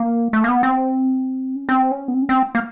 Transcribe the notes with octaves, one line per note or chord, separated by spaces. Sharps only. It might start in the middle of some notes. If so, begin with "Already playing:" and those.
Already playing: A#3
A3
A#3
B3
C4
C#4
C4
C#4
B3
C4
C#4
C4
A#3